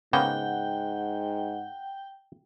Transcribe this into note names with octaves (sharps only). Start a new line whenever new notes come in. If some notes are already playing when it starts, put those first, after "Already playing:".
G#2 C#3 A#3 B3 F#5 G5